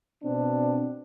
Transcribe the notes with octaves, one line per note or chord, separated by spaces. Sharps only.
B2 C4 D4